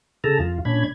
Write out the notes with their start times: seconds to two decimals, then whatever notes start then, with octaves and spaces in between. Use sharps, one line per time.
0.24 C#3 G#4 A4 A5 A#5
0.39 F2 F4
0.65 A#2 C#4 D4 B5 G#6